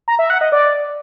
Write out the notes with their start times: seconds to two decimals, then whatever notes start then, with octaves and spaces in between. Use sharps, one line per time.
0.08 A#5
0.19 E5
0.30 F#5
0.41 D#5
0.52 D5